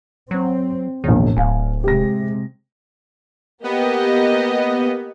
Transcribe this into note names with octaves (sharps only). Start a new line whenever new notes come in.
F#3 C4
E1 A#1 A2 D#3
D1 F5 G#5
C3 G#3 G4 A#6
A#3 B3 G4 D#5